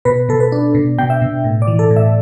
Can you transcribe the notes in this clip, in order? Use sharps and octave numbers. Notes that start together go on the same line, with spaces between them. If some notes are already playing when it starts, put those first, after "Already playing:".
B2 B4
B2 A4
B4
D4
B2
B2 G5
E5
B2
A2
D5
E3
A4
A2
E5